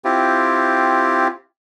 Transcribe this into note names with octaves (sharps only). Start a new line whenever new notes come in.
C4 E4 F4 G4